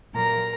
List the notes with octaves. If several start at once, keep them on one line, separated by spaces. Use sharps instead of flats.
A#2 F#3 A#3 A#4 A#5